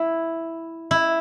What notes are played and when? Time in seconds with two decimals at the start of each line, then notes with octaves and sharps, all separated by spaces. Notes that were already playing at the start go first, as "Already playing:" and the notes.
Already playing: E4
0.91 E4